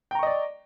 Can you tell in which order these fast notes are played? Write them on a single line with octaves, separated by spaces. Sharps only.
G5 A#5 C#6 D#5 D5